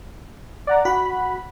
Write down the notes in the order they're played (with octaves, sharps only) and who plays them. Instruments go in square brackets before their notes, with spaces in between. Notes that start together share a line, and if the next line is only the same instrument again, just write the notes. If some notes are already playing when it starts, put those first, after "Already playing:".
[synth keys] D5 F#5 A#5
[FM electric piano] F#4 F#5 [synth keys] B5